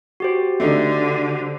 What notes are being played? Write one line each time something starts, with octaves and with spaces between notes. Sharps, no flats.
F#4 G4 C5
D3 A3 D4 D#4